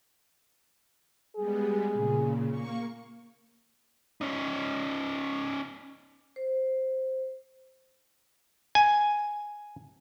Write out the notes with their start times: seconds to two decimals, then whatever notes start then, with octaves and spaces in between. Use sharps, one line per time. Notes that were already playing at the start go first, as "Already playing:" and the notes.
1.36 G3 G#3 B3 G#4
1.93 A#2 C#3
2.50 A#3 C#6
4.21 C#4 D#4
6.36 C5
8.75 G#5